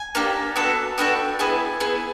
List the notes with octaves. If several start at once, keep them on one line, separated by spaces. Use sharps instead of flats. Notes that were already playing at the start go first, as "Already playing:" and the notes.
Already playing: G#5
A#3 D4 G4
B3 D4 F#4 A4
B3 D4 F#4 A4 G5
B3 E4 G#4 G#5
B3 E4 G#4